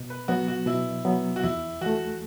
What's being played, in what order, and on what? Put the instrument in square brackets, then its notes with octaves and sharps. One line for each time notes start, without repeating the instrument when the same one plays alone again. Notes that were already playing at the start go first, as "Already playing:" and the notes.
Already playing: [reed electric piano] B2
[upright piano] B4
[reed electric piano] F#3 B3 [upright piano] F#4
[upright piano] F#4
[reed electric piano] B2 [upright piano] E4
[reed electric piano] F#3 B3
[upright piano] F#4
[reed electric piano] E2 [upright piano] E4
[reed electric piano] E3 A3 [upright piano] F#4